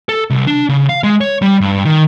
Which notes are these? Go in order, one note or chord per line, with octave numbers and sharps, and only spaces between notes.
A4
C2
D4
C#3
F5
G#3
C#5
G3
G2
D#3